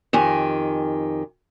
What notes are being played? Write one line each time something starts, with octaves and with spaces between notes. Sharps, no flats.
F2 D#3 G4 G#5